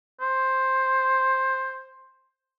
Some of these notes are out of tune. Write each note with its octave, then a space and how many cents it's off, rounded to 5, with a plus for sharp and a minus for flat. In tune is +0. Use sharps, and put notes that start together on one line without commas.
C5 +10